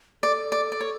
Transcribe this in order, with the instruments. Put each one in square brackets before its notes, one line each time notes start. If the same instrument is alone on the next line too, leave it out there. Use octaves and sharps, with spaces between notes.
[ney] A4 [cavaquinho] D5
[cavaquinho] D5
D5
C#5